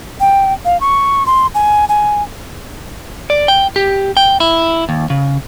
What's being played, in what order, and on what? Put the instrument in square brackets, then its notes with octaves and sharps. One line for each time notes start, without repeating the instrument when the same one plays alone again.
[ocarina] G5
F5
C#6
C6
G#5
G#5
[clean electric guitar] D5
G5
G4
G5
E4
D#2
C#3